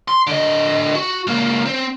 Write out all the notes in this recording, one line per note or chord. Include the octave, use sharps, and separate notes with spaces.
C6
D3 D#5
F#4
C#2 A#3
C4